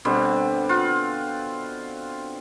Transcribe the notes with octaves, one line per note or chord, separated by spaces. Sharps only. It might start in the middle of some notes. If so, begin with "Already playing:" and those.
B2 D3 G3 C4
F4 F#5